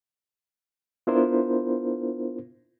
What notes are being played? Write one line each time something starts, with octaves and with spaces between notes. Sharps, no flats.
B3 D4 E4 F4 A#4 C5